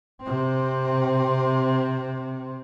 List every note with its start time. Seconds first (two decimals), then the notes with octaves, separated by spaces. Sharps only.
0.22 C3 C4